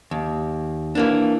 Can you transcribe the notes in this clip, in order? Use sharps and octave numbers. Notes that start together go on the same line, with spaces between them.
D#2
E3 A#3 D4